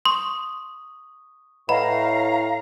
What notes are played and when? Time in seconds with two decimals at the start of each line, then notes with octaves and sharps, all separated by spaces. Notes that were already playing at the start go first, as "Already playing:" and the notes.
0.05 C6 C#6 D#6
1.69 A2 B4 D#5 F5 F#5 A#5 B5